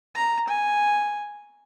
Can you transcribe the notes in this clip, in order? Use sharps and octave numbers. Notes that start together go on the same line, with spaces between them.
A#5
G#5